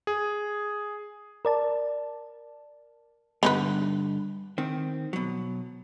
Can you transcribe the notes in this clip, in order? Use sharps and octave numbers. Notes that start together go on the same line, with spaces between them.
G#4
A#4 D5 A5
G2 D3 B3 D#4 B4
D#3 C4
B2 F#3